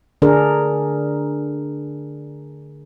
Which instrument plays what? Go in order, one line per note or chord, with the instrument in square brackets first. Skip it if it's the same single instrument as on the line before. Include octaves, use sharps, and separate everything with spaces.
[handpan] D3 D4 G#4 A#4